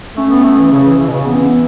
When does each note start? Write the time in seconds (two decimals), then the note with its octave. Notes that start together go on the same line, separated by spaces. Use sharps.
0.17 A3 C#4
0.30 B3
0.44 A3
0.58 E3
0.71 C#3
0.86 E3
0.99 E3
1.08 B2
1.12 C#3
1.26 E3 B3
1.35 C#4
1.44 B3